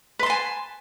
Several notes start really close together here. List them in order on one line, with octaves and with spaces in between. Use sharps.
B4 C6 A5 G#5